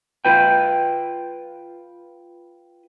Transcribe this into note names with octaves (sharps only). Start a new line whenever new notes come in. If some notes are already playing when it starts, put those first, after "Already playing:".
F4 B4 G5